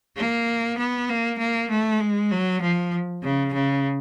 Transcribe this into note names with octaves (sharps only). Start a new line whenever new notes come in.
A#3
B3
A#3
A#3
A3
G#3
F#3
F3
C#3
C#3